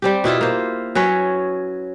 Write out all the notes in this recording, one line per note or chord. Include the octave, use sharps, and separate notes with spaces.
G3 C4 G4
B2 E4 F4 E5
A#3 C5
F#3 C#4 B4 C#5